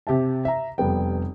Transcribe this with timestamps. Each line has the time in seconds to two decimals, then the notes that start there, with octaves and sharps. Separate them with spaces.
0.07 C3 G4 E5 A5
0.45 E5 A#5
0.78 F1 G3 B3 G5